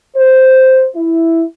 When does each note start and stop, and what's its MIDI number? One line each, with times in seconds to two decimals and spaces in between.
0.16 0.86 72
0.95 1.42 64